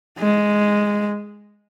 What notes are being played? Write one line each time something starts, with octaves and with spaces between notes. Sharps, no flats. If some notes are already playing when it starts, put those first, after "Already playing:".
G#3